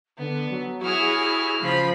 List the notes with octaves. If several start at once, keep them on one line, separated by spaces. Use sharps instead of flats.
D3 B3
F#3
E4 F#4 G#4 C#5 F6
C#3 F3 B5